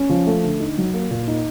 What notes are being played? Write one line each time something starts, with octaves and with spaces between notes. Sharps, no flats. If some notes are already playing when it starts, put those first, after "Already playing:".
Already playing: C#4
F3
A3
D3
D#4
F#3
A#3
A#2
D#4